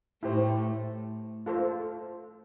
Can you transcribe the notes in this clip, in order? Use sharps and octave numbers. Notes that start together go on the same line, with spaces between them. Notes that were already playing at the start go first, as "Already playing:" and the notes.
A2 A3 E4 G4 C5
F4 A4 C5